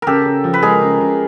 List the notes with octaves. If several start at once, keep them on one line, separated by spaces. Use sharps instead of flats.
C#3 G4 A4 A#4
C#3
F3
B4
G#3 G#4 A#4
C#3
C#3